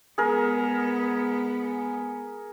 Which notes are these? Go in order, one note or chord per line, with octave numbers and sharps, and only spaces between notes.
G#3 B3 G#4 A#4